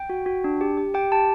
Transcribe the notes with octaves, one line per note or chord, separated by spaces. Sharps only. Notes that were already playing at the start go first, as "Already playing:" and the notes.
Already playing: G5
F#4
F#4
D4
G4
G4
G4 G5
G4 A5